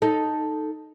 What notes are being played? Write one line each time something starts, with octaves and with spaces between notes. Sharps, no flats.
D#4 A4